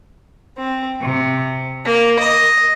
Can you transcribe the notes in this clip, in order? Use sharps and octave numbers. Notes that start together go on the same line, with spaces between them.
C4
C3
A#3
D#5